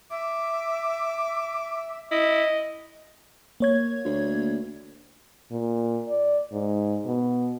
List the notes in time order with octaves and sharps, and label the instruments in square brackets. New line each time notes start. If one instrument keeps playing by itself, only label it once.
[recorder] E5 [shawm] D6
[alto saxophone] E4 [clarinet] D#5
[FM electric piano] A#3 C#5 G#6
[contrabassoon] D2
[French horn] A#2
D5
G#2
B2